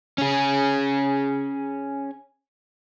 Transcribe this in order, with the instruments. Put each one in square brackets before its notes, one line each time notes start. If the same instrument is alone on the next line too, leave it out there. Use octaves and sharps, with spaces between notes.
[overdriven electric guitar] C#4 G#4